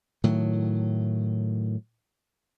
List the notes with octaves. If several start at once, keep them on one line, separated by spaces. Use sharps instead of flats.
A2 D#3 F#3